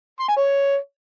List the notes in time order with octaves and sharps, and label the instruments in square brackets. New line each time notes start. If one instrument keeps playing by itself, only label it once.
[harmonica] C6
G#5
C#5